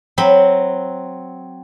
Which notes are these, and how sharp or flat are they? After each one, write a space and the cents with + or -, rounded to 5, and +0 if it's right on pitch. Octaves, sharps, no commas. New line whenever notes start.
F#3 +5 C4 +0 B5 +0